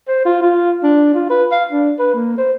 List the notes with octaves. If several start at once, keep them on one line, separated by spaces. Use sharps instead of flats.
C5
F4
F4
D4
F4
B4
F5
D4
B4
A#3
C5